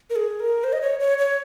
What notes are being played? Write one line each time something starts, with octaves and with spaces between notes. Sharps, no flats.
A#4
G#4
A#4
C5
D#5
C#5
C#5
C#5